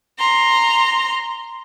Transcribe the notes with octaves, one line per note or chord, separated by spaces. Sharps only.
A#5 C6